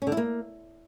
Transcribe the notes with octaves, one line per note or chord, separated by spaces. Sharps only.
C#4
D3
E4
A#3